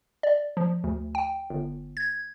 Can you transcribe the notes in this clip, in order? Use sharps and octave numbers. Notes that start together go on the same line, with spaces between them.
D5
F3
D2
G5
G1
G#6